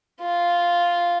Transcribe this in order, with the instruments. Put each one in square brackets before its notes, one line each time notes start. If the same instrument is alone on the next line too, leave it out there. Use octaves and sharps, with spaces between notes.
[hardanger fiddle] F4